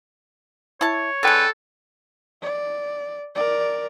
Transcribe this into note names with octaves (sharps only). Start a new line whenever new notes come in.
E4 C#5 A5
D3 G#3 A4 B4 G5
D5
A#4 D5